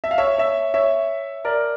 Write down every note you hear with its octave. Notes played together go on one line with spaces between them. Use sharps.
E5
F5
C#5 E5
C#5 E5
C#5 E5
A#4 D5